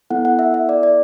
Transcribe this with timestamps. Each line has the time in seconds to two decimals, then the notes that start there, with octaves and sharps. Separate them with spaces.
0.10 B3 E4 A4 F#5
0.25 F#5
0.39 E5
0.54 E5
0.69 D5
0.83 D5